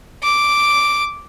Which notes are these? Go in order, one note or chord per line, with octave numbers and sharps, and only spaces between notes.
D6